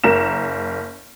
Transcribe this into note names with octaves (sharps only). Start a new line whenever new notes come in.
F#1 A#4 E7